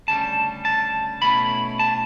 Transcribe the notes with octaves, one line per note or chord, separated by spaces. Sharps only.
D2 C#3 G3 A5
A5
B2 A3 C#4 E4 B5
A5